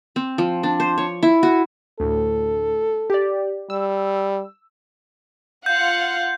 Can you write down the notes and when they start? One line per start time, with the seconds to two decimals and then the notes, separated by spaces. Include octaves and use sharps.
0.16 C4
0.38 F3
0.63 D4
0.80 C5
0.98 C#5
1.23 E4
1.43 F#4
2.00 D2 A2 A4
3.10 G4 D5
3.70 G3 E6
5.66 F4 F5 F#5 G6